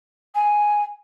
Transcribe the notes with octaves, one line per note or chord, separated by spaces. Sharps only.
G#5